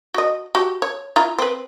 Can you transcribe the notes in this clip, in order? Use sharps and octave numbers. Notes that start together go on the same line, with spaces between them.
F#4 D#5
F#4 G4
C#5
E4 F4 A#5
C4 B4